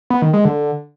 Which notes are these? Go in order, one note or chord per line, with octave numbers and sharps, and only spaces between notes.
B3
D#3
G#3
D3